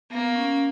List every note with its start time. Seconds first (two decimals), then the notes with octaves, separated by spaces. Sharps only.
0.10 A#3 B3
0.36 C#4